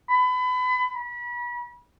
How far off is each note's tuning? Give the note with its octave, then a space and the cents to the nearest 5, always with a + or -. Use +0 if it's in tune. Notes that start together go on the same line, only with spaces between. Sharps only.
B5 +30
B5 -35